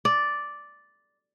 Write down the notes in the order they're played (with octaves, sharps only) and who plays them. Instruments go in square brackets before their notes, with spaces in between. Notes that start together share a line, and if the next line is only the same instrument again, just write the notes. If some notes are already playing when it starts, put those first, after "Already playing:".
[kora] D5